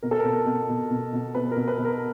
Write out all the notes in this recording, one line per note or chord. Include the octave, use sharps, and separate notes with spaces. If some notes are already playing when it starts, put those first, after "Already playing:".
B2 A#4
A4
B2 A#4
B2
B2
B2
B2
B2 B4
A#4
B2
B4
B2
A#4